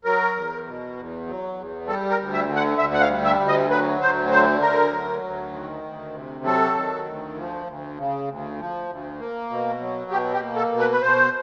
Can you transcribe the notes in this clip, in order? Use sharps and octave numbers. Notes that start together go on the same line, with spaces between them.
F#3 A#4
E2
B2
E2
F#3
E2
G3 A4
A#4
D2
E5
D3
F#5
D2 E5
F#5
F5
G3
E5
D2
D#5
F#3 B4
D2 C5
D3 C5
D2 A#4
F#3
D2
D#3
D2
C3
F#3 A4
D#3
D2
F3
D2
C#3
D2
F3
D2
A#3
B2
F#3
B2 G4
G4
A#3
A4
B2
B4
B4
B2 C5